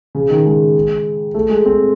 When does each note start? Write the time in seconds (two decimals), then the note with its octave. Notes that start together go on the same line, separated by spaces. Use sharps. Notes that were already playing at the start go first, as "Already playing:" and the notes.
0.15 C#3
0.30 D#3
0.46 G#3
1.34 A3
1.49 G#3
1.66 C4